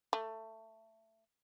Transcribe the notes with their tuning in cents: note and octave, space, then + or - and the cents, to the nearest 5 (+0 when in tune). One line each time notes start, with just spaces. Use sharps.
A3 +15